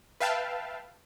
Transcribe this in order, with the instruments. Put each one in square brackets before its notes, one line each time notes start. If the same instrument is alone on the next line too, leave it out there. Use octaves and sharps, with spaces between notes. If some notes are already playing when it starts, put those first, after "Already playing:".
[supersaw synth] B4 E5 F5 G5 A5